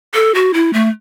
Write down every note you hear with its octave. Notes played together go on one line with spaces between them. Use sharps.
A4
F#4
E4
A3